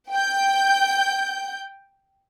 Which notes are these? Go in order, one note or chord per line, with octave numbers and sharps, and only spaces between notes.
G5 G6